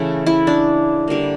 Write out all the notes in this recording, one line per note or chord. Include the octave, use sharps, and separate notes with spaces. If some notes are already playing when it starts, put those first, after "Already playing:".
Already playing: C#3 E3 A3 E4
E4
D4
D3 G3 A#3